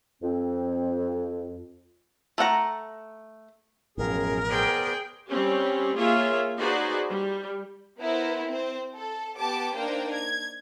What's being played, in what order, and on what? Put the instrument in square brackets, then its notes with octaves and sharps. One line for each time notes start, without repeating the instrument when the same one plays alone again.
[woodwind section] F2 C4
[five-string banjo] A3 A4 F#5 A#5
[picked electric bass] A1 B2 F3 [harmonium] F#2 G#4 [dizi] A#4
[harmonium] B3 C5 D5 [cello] G#4 G5
[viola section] G3 C4 C#4 G4
A#3 F4 G#4 C#5 E5
D#4 F#4 G#4 B4 C5 D5
G3
[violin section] B3 E4 A#4 C5
C4 C5
A4
B3 G4 A5 D6
A#3 D4 D#4 A#4 C5 G5
G#6